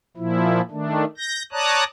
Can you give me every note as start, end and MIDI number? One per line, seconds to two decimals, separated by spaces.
0.17 0.61 46
0.17 0.61 53
0.17 0.61 64
0.71 1.05 51
0.71 1.05 57
0.71 1.05 62
1.17 1.43 91
1.17 1.43 94
1.52 1.84 73
1.52 1.84 74
1.52 1.84 81
1.52 1.84 82
1.52 1.84 87
1.52 1.84 90